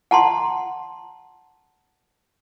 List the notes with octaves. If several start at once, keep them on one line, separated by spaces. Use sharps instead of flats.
F#5 A5 A#5 C6